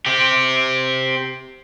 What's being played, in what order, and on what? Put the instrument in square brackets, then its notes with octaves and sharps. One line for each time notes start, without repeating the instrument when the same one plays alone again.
[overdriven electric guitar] C4 G4